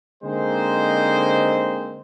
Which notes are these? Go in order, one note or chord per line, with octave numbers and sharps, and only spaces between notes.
D3 G#3 A#3 C4 D#4 C5